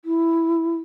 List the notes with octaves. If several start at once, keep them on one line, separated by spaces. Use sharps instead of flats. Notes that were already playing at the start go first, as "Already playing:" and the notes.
E4